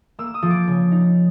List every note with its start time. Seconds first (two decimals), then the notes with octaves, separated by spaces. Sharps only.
0.19 A#3 E6
0.34 D#6
0.42 F3
0.50 D6
0.67 C#3
0.91 D#4